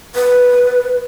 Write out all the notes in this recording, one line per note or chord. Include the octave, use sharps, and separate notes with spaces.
B4